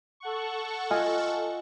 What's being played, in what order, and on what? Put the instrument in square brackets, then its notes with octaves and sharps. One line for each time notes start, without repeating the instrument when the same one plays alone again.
[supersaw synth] A4 F#5 C#6
[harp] F4 D#5 G#5